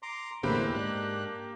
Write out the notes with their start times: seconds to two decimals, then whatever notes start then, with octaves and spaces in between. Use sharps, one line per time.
0.03 A#5 C6 D6
0.43 E2 A2 D3 A#3 E4 G4 B4 C5
0.75 G#2 D4 F#6